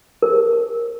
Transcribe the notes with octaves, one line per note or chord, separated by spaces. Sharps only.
A#4